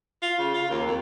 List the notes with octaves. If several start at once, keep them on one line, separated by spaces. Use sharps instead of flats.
F4
C#3
F4
D#2
F2